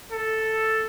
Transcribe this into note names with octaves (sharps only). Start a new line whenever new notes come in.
A4